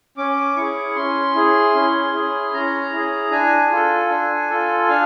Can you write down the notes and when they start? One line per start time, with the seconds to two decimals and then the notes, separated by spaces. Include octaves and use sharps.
0.17 C#4 D6
0.57 E4 G#4 C#6
0.96 C#4 C6
1.35 E4 G#4
1.75 C#4
2.13 E4 G#4
2.54 C#4 A#5
2.92 E4 G#4
3.31 D4 G#5
3.72 F4 A4
4.10 D4
4.50 F4 A4
4.89 D4 F5